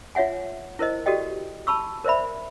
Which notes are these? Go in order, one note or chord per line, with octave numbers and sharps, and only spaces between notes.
F4 C#5 E5 F#5 G#5
E4 A#4 C5 D#5
F#4 G4 A4 D5 D#5 G5
A5 B5 C#6 E6
A#4 C5 D5 E5 B5